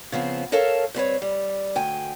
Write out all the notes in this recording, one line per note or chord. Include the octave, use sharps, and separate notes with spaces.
C#3 F3 B3 C4
A4 A#4 C#5 E5 F5 A5
G2 C4 B4 C#5
G3
D2 G5 G#5